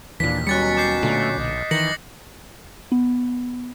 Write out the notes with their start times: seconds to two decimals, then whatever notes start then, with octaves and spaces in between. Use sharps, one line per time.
0.20 D#2 A#2 E3 D4 B6
0.47 B2 F#3 G3 C#4 F#6 A6 C#7
0.77 D6 G6 C7
1.03 A#2 D3 A3
1.38 B1 D#5
1.71 D#3 E3 A#6 C#7 F#7
2.92 B3